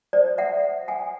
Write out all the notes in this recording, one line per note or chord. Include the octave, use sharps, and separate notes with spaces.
C5 D5
E5 F#5
F#5 G#5